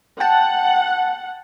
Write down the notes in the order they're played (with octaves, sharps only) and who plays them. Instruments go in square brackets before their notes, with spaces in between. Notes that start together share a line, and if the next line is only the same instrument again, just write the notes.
[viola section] F#5 [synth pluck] G5 A5